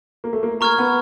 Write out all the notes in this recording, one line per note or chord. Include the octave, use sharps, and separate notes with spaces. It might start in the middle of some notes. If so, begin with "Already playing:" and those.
A#3
A3
A#3
A#3 A#5 C#6 F6 G#6
B3